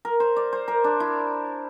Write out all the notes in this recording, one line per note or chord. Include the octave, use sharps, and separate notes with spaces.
A#4
C5
D5
C5
A#4
D4
E4